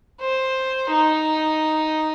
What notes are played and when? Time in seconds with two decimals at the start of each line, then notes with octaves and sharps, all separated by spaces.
0.20 C5
0.91 D#4